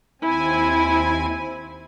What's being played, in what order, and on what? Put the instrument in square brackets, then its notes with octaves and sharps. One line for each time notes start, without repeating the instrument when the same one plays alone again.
[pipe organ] D#2 C4 G#5 [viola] E4